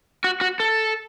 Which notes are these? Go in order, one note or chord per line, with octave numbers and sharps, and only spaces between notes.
F#4
F#4
A4